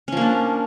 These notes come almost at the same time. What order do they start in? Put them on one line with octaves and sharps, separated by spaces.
C#4 F3 A#3 D4